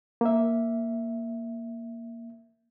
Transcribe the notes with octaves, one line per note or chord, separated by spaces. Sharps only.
A#3 E5